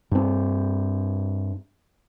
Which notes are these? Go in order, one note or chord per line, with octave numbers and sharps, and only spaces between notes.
G2 C4